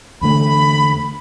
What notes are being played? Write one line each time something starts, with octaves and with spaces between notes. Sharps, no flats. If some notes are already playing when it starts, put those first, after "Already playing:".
E2 D3 A3 B5